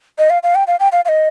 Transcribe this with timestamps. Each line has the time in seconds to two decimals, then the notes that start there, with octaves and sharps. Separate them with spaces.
0.18 D#5
0.30 F5
0.43 F5
0.55 G5
0.67 F5
0.80 G5
0.92 F5
1.05 F5
1.09 D#5